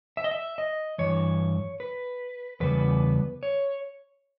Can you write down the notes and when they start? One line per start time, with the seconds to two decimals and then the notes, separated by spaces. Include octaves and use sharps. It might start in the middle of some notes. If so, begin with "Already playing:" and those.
0.17 E5
0.24 D#5
0.31 E5
0.58 D#5
0.98 G2 E3 C#5
1.80 B4
2.60 E2 C#3 G3 B3 B4
3.43 C#5